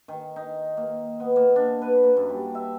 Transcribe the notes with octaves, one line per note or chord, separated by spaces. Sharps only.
D#3
D#4
A#3
B3
A#3
D4
B4
A#3
F#2
G3
E5